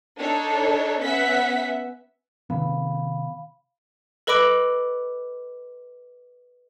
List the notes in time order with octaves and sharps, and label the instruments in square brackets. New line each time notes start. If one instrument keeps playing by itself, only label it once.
[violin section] D4 D#4 A4 C#5
B3 C#4 B4 E5 F#5 B6
[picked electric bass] C3 D#3 B3 [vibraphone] F5 B5
[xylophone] A4 B4 D#5 B5 D6 D7